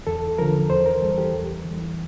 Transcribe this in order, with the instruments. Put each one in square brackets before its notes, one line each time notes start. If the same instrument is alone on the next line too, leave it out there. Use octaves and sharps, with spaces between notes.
[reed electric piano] E2 A4
D3 F3 A#4
E2 C5
A#4
E3 G3 A4
G4
E2
E3 G3